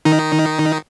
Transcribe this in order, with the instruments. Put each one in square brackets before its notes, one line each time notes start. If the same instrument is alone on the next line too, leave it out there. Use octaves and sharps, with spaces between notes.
[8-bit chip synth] D#3 D#4